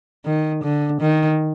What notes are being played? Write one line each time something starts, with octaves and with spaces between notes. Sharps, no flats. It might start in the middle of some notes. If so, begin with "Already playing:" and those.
D#3
D3
D#3